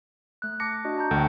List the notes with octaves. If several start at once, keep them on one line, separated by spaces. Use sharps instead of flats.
A3 F#6
A5 D6 A#6 C#7
D4 F#4 D#5
A5 A#5 G6
D2 A4 G5